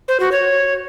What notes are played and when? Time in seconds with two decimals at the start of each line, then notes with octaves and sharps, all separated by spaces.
0.08 C5
0.20 F#4
0.32 C#5